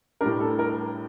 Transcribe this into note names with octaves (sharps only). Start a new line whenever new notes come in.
A2 G3 D4 A#4
A4
A#4